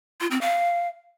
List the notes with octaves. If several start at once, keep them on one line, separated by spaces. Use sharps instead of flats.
F4
C4
F5